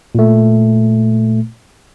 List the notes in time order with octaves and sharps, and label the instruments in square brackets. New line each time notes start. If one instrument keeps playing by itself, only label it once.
[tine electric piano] A#2 A3